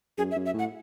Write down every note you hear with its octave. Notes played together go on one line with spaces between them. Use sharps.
F#2 G#4
E5
F#2
E5
A2 F#5